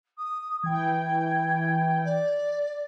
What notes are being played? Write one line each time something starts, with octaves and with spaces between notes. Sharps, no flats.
D#6
E3 G5 G#6
D5